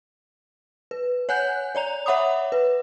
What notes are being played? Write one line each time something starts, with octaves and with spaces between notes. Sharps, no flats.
B4
C#5 F#5 G#5 F#6 G6
C#5 D5 A#5 F7
C#5 E5 F#5 B5 D6 D#6
B4